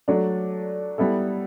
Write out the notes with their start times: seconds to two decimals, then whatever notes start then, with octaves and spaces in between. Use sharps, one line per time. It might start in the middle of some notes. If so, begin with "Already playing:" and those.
0.08 F#3 A3 D4
0.98 G3 B3 E4 A4